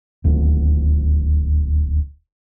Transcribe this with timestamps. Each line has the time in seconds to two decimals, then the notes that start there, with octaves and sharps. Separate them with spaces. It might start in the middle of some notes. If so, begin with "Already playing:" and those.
0.24 D#1 D2